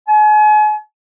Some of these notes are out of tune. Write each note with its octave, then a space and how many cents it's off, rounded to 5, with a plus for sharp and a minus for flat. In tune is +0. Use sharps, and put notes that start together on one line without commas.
G#5 +40